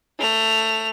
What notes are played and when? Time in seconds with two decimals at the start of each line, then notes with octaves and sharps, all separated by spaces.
0.19 A3 F7